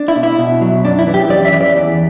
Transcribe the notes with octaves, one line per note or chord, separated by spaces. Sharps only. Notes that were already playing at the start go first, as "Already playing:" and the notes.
Already playing: D4
E4
B2
E4
B2
F#3
F#2 D4
E4
E3
G4
F#2 D5
E5
E3
D5
E2